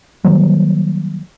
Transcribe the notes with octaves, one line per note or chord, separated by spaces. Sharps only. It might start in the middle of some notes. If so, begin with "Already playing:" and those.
D#3 F#3 G3 A#3